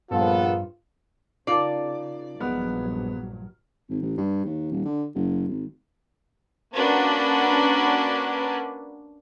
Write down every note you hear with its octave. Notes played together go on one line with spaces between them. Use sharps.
A#1 G2 B3 F4 A4
C#3 D#4 F4 A#4 D5 A5 C7
A#1 G2 F#3 G#3 B3 F6
G#1
A1
G2
D#2
D#1
D3
F#1
G#1
A#3 C#4 D4 F#4 B4